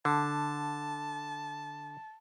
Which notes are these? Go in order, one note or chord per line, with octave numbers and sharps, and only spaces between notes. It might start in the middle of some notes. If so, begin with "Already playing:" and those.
D3 A5